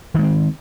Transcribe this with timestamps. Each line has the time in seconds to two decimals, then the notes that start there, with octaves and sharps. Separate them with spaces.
0.14 D#3
0.19 G#3
0.23 C4